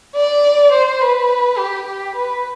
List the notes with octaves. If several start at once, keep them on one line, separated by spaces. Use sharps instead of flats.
D5
C5
B4
G4
G4
B4